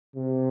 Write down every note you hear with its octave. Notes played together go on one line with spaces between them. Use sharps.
C3